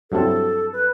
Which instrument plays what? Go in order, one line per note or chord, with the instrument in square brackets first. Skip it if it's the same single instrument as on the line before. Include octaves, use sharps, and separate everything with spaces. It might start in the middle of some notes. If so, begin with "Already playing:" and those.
[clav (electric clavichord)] G2 F#3 A3 C4 E4 [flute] A4
[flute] B4